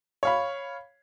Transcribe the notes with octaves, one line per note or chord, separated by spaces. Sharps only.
C#5 F5 B5